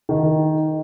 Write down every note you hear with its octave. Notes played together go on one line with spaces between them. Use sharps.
D#3